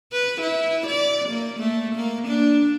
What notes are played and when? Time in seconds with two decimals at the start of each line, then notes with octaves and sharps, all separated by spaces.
0.12 B4
0.41 E4
0.87 D5
1.29 A#3
1.59 A3
1.95 A#3
2.27 D4